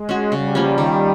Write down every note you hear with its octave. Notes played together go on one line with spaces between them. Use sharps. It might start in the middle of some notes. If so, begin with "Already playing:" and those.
Already playing: G#3
C#4 F#4
C#3 G3
F3 A#3 C#4
D#3